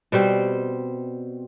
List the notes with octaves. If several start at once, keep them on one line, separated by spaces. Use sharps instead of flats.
B2 G3 C4 C5